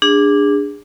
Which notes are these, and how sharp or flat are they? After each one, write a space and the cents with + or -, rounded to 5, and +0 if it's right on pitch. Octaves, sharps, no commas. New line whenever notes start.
D4 +0 G#4 -25